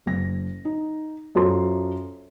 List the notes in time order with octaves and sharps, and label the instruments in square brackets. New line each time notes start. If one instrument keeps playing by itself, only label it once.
[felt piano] F#1 A#6
D#4
F#2 F4 A4 C5 C6